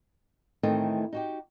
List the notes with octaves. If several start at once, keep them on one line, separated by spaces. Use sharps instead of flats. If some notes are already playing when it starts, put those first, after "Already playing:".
A2 D#3 E3 A3 C4 D#4
D#4 F#4 G4